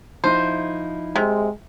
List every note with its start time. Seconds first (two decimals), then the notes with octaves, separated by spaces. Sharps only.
0.24 F3 D#4 E4 C5
1.16 C3 G#3